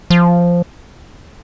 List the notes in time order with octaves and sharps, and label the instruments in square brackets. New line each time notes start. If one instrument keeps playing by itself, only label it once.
[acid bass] F3